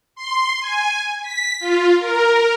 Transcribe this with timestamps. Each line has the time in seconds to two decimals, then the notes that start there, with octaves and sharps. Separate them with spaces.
0.16 C6
0.60 G#5
1.23 B6
1.60 F4
1.99 A#4